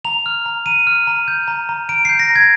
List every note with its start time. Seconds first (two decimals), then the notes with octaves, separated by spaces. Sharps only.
0.05 A#5 F7
0.26 F6
0.46 A#5
0.66 A#5 D#7
0.87 F6
1.07 A#5
1.28 G6
1.48 A#5
1.69 A#5
1.89 A#5 D7
2.05 G6 C7
2.19 A#6
2.30 A#5
2.35 G#6